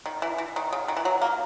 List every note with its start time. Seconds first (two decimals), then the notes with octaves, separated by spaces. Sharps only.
0.06 D#3
0.22 E3
0.38 E3
0.56 D#3
0.73 C#3
0.88 D#3
0.97 E3
1.05 F#3
1.22 A#3